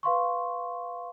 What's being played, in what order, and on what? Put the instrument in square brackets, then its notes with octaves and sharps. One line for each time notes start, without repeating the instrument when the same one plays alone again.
[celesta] B4 F5 C6 C#6